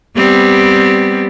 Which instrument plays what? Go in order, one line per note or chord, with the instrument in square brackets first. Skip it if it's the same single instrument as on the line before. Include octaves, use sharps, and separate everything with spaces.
[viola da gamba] G3 B3 C4